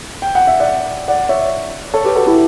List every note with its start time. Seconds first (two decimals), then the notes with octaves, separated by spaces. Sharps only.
0.22 G5
0.35 F#5
0.47 E5
0.60 D5 F#5
1.08 D5 F#5
1.29 C#5 E5
1.94 A4 C#5
2.05 G4 B4
2.15 F#4 A4
2.26 E4 G4